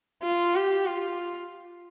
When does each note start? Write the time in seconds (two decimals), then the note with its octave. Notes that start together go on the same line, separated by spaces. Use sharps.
0.23 F4
0.55 G4
0.86 F4